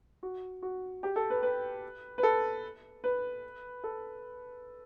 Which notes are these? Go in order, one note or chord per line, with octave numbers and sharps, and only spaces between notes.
F#4
F#4
G4
A4
B4
B4
B4
A4
B4
A4